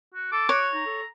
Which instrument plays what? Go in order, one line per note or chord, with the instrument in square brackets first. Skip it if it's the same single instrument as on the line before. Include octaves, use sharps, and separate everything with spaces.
[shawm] F#4
[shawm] A4 [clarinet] D6
[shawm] F#4 [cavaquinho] C#5
[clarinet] D#4 [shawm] A#5
[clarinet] A4